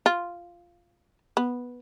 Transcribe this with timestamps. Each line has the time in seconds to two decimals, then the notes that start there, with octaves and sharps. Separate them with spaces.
0.06 F4
1.37 B3